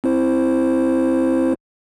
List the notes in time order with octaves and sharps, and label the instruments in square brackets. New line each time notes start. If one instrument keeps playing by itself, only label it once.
[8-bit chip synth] C4 E4 C5